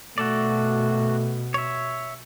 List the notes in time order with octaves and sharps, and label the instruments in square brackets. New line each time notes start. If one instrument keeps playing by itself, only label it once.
[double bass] B2 [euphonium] A3 [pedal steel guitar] F#4 A4 D5
[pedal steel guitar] C#5 E5